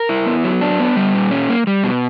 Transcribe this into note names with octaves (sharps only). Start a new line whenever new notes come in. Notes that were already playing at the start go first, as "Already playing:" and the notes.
Already playing: A#4
E4
B3
F#3
D4
B3
G3
A#2
C#4
A#3
G3
B2